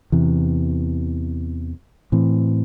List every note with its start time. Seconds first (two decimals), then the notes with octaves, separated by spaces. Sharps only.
0.12 E2 C3 E3
2.12 A2 E3 C4